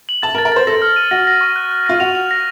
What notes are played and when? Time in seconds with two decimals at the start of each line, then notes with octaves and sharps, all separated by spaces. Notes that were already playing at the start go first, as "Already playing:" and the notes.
0.09 F#7
0.22 A5 A6
0.35 A#4
0.38 A6
0.45 A#4
0.52 C5 A6
0.67 A4 A#6
0.82 F6
0.96 D#7
1.11 F#4 A#6
1.27 A#6
1.41 C#6
1.56 F#6
1.71 F#6
1.86 F4 A#6
2.00 F#4 F7
2.15 F7
2.31 A#6